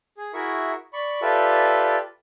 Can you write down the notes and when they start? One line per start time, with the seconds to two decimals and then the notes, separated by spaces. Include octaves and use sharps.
0.18 G#4
0.34 E4 F#4 G#4 A#4 E5 C#6
0.93 D5 B5 C#6
1.22 F4 G4 A4 B4 D5 E5